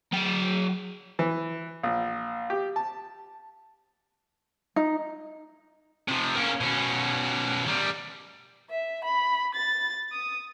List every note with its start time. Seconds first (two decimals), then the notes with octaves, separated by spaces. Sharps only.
0.12 F#3 G5
1.19 E3
1.83 A#1
2.50 G4
2.76 A5
4.76 D#4
6.08 C3 F3
6.35 A#3 C#4
6.61 B2 C#4
7.66 D#3 G3
8.70 E5
9.04 B5
9.55 A6
10.12 D#6